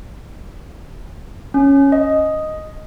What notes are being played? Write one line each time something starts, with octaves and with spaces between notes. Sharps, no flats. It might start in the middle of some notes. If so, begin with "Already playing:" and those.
C#4
D#5